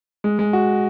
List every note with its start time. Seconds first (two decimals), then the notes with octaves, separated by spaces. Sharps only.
0.24 G#3
0.39 G#3
0.53 F#4